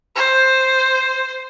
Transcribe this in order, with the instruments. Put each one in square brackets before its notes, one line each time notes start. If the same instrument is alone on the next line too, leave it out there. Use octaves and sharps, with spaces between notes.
[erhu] C5